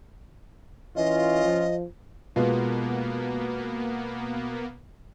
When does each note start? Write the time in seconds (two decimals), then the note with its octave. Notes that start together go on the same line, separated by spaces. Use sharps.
0.96 E3 C#4 F4 D#5
1.45 F3
2.36 B2 G#3 A#3 B3 F4